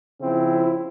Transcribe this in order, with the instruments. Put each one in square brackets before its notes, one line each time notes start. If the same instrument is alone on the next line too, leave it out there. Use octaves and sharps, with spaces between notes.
[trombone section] C#3 F3 C4 E4